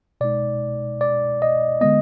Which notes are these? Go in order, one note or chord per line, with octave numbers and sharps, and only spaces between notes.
B2 G#3 D#4 D5
D5
D#5
D3 G#3 B3 D#5